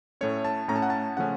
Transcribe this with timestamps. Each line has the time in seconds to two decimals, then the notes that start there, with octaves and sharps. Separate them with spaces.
0.21 A2 A3 C#4 C#5
0.45 A5
0.68 A2 A3 C#4 A#5
0.76 A5
0.82 F#5
0.90 A5
1.17 C#3 F3 A3 C#4 F#5